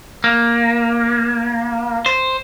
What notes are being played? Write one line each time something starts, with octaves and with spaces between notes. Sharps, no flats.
A#3
C5